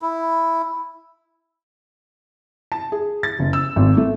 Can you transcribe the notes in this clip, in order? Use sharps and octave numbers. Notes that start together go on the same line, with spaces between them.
E4
A5
G#4
A6
F#1
E6
G#1
A3